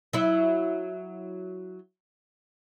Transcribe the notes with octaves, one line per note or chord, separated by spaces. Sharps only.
F#3 E4